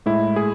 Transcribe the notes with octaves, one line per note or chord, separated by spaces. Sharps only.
A2 G#3 E4
G#4